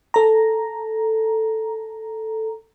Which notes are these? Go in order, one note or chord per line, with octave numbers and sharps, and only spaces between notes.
A4 A#5